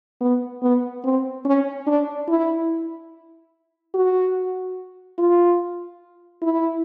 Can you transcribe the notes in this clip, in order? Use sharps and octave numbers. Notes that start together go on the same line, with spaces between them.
B3
B3
C4
C#4
D4
E4
F#4
F4
E4